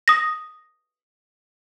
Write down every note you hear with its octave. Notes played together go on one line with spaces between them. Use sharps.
D#6 A#6